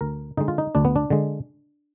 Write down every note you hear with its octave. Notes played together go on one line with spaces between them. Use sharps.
D2 A#4
D3 G#3 D#4
F4
D#4
D2 D4
B3
D4
D3 G#3